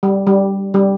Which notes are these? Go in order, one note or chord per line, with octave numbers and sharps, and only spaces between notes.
G3
G3
G3